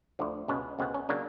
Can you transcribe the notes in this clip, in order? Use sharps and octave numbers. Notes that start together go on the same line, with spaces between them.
D2 D3 F3
C#2 B2 G#3 B3 C#4
C#2 B2 G#3 B3 C4
C#4
C#3 F#3 A#3 D4